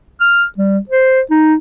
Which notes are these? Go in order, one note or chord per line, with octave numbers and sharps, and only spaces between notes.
F6
G3
C5
D#4